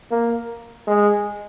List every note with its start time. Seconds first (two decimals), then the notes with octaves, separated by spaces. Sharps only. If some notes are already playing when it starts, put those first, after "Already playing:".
0.11 A#3
0.87 G#3